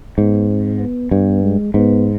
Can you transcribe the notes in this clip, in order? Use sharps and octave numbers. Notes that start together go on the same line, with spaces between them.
G#2 B3
C4
B3
G2 B3
G#3
G#2 B3